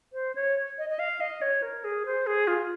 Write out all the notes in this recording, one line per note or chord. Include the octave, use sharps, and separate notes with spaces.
C5
C#5
D#5
D#5
F5
D#5
C#5
A#4
G#4
C5
G#4
F4